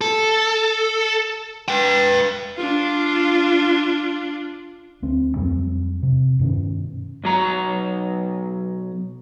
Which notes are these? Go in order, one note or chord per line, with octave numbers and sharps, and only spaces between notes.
A4
B4 G5
D4 F4
D2 C4
F2 F#3 G3 C4
C3
G2 B2 D#3 C#4
B1 F#3 A#5